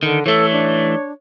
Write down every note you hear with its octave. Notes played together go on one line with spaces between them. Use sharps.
D3 D#3
E3 A3 A4 C#5
D4